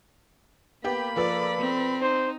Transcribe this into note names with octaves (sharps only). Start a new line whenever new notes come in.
A#3 B3 G4 B5
F3 A4 B4 D5
C4
D#4 C5